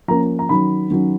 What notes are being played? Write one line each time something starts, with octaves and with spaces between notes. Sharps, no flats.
F3 A#3 C#4 A#5
A#5
D#3 F#3 C#4 B5
D#3 F#3 C#4